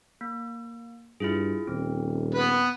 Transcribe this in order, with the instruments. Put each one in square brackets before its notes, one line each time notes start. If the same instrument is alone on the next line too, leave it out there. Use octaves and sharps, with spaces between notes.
[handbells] A#3
[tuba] G2 [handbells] E4 F4 G#4
[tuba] D#1 [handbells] C4
[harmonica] B3 B4